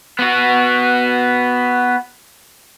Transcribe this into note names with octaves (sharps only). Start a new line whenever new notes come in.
B3 F#4